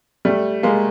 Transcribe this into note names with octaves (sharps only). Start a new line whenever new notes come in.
G3 A3
G#3 A#3